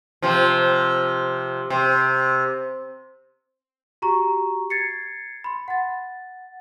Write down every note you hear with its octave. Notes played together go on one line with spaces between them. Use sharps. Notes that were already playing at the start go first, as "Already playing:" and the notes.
C3 F3
C3
F#4 G4 A#5 C#6
G#6 A6 C7 C#7
B5 C6
F#5 A6